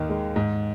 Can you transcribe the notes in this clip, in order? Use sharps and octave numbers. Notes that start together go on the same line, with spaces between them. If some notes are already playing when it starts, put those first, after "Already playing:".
Already playing: D#2 D#3
G#3
G#2